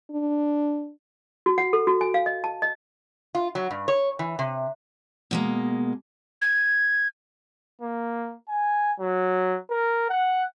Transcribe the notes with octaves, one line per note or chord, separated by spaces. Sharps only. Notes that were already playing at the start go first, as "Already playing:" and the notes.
D4
F#4
F#5
A4
F#4
G#5
F5
D#5
A5
D#5
F4
F#3
G2
C#5
E3
C3
B2 G#3 A#3
G#6
A#3
G#5
F#3
A#4
F#5